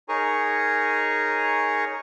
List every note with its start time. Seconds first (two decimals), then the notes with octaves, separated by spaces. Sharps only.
0.09 D#4 G#4 A#4 C#5 G#5 C#6